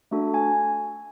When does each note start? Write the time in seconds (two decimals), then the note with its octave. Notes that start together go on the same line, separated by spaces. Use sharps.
0.11 A3 D4 F#4 A4
0.34 G#5